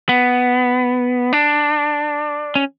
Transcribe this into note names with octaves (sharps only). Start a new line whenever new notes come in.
B3
D4
C#4